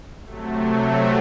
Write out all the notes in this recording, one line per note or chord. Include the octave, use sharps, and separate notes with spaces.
C3 F#3 A3